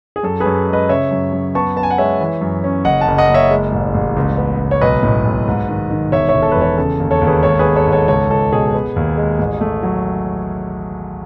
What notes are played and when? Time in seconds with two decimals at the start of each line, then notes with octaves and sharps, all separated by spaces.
0.16 G#4
0.23 F#2 A4
0.40 G#4 B4
0.46 F#2
0.67 G#3
0.73 B4 D#5
0.89 C#3 C#5 E5
1.11 F#2
1.33 F#2
1.55 B3 A5 C#6
1.77 B3 A5
1.83 G#5
1.90 F#5
1.98 G#3 C#5 E5
2.21 E3
2.41 F#2
2.64 C#4
2.85 F#1 D#5 F#5
3.01 F#5 A5
3.07 F#1
3.18 D#5 F#5
3.29 F#1
3.34 C#5 E5
3.50 G#3
3.72 A1
3.94 A1
4.16 C#2
4.38 B3
4.60 C#2
4.71 C#5
4.81 B1 B4 D#5
5.03 A2
5.25 B1
5.47 G#2
5.68 D#3
5.91 D#3
6.12 E1 C#5 E5
6.29 C#5 E5
6.35 E1
6.42 A4
6.52 E2 B4
6.61 A4 C#5
6.77 C#3 A4
7.00 D#2
7.11 A4 C#5
7.21 D#2
7.27 G#4 B4
7.43 G#1 A4 C#5
7.59 G#4 B4
7.65 B3
7.76 A4 C#5
7.86 G#2
7.92 A4 C#5
8.08 C#2 A4 C#5
8.30 C#2 A4
8.52 B2 G#4
8.75 B3
8.96 D#2
9.17 G#3
9.39 A1
9.61 A3
9.83 F#3